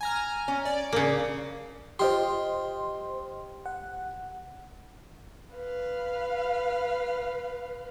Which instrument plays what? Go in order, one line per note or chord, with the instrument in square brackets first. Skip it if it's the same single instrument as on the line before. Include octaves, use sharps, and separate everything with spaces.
[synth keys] G#5 A#5 F6
[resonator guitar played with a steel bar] C#4
[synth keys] D5
[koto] C#3 A#3 [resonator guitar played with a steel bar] D4
[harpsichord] F4 G4 [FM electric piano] C5 D#5 C6
[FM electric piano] F#5
[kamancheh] B4 F5